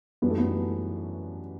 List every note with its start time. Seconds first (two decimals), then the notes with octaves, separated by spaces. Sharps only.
0.22 F#2 E3 G3 B3 D4 F#4
0.30 A3
0.38 B3